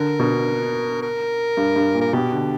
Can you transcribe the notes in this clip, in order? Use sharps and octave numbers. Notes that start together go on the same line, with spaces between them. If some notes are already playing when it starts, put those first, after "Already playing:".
Already playing: D3 A#4
B2
A#4
G2
G2
A#2
A#4
B2 G4
D3